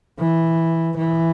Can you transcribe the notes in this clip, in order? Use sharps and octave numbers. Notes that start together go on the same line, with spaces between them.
E3
E3